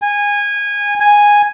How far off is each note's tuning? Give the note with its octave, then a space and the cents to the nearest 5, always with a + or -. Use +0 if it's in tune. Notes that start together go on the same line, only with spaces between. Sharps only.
G#5 -20
G#5 -5